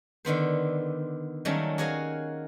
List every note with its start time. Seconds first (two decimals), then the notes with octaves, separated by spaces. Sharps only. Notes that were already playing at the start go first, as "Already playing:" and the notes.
0.25 D3 D#3 B3 C5
1.45 D#3 F#3 G3 A3 A#3 C#4
1.78 F#4 G#4 C#5 D#5 F5